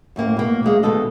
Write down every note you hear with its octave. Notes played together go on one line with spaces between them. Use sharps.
F#2 A2 A#3 C4
B2 A#3
D2 F#3 G#3 F5
D2 B2 D#3 A4 D#5